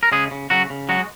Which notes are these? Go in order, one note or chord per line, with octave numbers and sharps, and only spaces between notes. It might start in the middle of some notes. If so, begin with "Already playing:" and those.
A#4
C#3 G#3 G#4
C#3
C#3 F#3 F#4
C#3
F#3 G#3 F#4